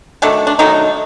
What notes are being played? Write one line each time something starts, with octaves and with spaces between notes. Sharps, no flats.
D#3 F#3 A3 D4
D4
D#3 F#3 A3 D#4